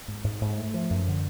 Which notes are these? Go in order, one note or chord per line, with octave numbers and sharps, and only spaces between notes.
G#2
G#2
G#2
A3
F3
F#2
D3